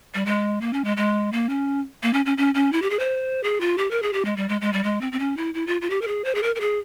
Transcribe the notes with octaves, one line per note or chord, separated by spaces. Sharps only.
G3
G#3
A#3
C#4
G#3
G#3
A#3
C#4
A#3
C#4
C#4
C#4
C#4
E4
G4
G#4
C5
G#4
F4
G4
A#4
G#4
G4
G#3
G3
G#3
G#3
G3
G#3
C4
C4
C#4
E4
E4
F4
F4
G4
A#4
G#4
C5
G#4
A#4
A#4
G#4